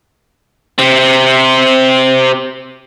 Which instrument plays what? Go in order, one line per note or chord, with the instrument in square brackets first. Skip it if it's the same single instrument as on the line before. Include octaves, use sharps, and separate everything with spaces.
[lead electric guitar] C3 C4